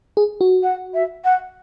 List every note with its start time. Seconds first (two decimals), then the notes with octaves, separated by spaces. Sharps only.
0.17 G#4
0.41 F#4
0.63 F#5
0.94 E5
1.24 F#5